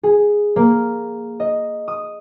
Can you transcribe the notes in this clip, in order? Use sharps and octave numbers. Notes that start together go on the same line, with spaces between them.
G#4
A#3
D#5
D#6